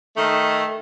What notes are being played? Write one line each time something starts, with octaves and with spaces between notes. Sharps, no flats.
D#3 A3